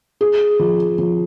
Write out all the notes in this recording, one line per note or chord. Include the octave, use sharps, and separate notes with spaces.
G#4
F3
F3